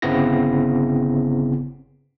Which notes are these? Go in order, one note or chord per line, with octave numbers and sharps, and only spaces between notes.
G1 C#3 B3 C4 E4 A#6